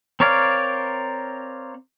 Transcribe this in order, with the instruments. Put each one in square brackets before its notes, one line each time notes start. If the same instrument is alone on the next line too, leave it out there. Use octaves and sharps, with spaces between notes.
[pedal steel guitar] C4 A#4 C#5 D5 F5